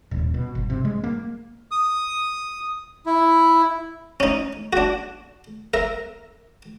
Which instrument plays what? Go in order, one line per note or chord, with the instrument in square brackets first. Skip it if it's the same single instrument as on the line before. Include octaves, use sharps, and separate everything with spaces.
[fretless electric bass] D#1
B2
G1
C3
G#3
A#3
[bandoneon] D#6
E4
[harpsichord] C#4 D#4
D4 F#4
A#4 E5